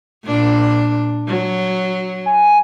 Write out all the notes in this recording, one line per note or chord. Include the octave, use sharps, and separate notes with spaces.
A#2 D4
F#3
G#5